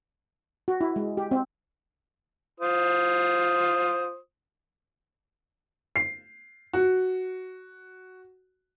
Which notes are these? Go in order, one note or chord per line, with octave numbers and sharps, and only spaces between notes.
F#4
E4
G#3
G4
C4
F4 C5 D#6
C7
F#4